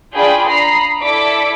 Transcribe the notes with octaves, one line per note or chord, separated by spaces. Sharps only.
D4 F4 G#4 D5 G5 B5
A#5 B5 D#6 C7
E4 A4 D5 D6 B6 D7